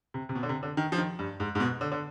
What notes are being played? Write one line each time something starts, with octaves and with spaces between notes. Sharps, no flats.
C3
C3
B2
D3
C3
D3
D#3
F3
D#3
G2
G#2
G#2
B2
D3
D3